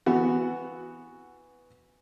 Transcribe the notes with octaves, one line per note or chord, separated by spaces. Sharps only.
E3 B3 F#4